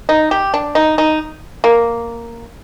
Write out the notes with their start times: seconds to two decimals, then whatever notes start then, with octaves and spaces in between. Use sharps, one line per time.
0.09 D#4
0.31 G4
0.54 D4
0.75 D#4
0.98 D#4
1.64 A#3